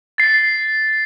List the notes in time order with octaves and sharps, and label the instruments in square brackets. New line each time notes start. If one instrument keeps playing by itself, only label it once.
[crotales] A6 C7